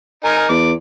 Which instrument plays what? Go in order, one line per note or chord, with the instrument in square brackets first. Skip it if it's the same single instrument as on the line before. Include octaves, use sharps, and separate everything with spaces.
[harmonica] D#4 A#4 G#5
[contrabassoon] E2 [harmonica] D6